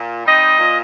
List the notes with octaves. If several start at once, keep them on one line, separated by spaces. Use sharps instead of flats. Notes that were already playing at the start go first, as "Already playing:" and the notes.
Already playing: A#2
G3 C4 D#4 D#5
A#2